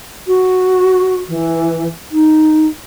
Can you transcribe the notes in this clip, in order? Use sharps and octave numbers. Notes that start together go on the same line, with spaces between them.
F#4
E3
D#4